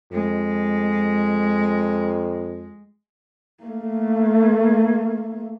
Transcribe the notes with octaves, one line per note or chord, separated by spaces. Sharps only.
F2 G#3
A3 A#3